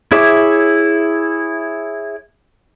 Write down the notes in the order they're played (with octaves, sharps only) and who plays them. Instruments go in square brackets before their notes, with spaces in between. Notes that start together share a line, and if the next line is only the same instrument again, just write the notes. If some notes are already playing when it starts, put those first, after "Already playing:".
[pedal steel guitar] E4 G#4 C#5 E5 D6